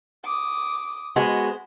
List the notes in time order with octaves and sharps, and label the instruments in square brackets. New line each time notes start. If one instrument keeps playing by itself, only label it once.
[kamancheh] D6 D#6
[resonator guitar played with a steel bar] G#3 B3 [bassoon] F#4 [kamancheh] C5